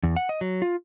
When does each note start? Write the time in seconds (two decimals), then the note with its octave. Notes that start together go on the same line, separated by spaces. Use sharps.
0.03 E2
0.16 F#5
0.29 D#5
0.41 F#3
0.62 F4